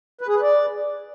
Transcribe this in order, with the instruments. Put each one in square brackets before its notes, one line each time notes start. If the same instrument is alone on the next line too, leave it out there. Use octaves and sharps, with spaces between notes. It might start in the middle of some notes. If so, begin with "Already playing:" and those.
[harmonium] B4
G#4
B4
D5